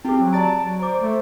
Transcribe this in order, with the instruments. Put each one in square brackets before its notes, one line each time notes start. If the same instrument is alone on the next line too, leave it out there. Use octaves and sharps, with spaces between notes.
[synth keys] C4 F4 G4 [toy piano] E4 G#4 [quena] G5
[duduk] F#3
[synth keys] D5 A6 D7 [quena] A5 [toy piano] A#5
[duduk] F#3
[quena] C5 [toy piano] A#5 D6
[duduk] A3 [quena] C5